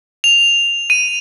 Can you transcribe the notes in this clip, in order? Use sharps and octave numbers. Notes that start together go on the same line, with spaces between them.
F7
D#7